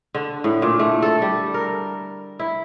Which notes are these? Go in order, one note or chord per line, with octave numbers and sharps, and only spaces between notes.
D3
A2
A#2
A3
A4
G3
A#4
E4